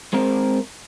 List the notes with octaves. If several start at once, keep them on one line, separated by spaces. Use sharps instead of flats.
G#3 C4 A#4